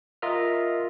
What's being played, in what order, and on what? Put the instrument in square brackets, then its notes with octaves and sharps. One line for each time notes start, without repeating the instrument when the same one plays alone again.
[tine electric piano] F4 A#4 D#5 E5 F6